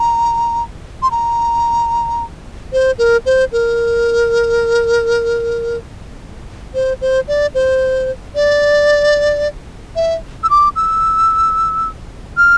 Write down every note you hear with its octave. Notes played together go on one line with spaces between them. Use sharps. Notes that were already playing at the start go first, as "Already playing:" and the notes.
Already playing: A#5
C6
A#5
C5
A#4
C5
A#4
C5
C5
D5
C5
D5
E5
E6
D6
E6
F6